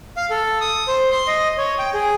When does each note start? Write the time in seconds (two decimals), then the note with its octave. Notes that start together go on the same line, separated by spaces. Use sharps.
0.17 F5
0.31 A4
0.61 D#6
0.88 C5
1.11 C6
1.28 D#5
1.58 C#5
1.79 G5
1.94 G#4